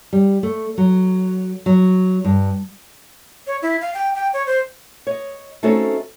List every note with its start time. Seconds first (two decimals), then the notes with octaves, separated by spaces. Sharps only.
0.13 G3
0.43 A3
0.78 F#3
1.66 F#3
2.25 G2
3.47 C#5
3.62 E4
3.81 F5
3.94 G5
4.15 G5
4.33 C#5
4.47 C5
5.07 C#5 D#5
5.63 A3 C4 C#4 D#4 F#4 A4